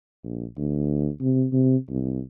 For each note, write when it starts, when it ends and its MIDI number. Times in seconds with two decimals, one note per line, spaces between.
0.23 0.45 34
0.57 1.09 38
1.21 1.46 48
1.52 1.76 48
1.90 2.21 36